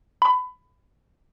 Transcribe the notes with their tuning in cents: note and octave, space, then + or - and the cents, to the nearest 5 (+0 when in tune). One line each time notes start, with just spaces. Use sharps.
B5 +25